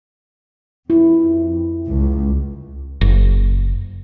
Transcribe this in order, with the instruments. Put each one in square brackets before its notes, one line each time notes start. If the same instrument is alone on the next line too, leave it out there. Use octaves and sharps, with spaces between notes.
[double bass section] F2 [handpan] E4
[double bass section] C#2
[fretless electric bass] F#1